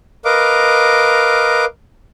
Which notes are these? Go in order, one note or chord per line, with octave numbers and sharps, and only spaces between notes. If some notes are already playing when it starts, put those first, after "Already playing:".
A#4 B4 D#5 F5 D6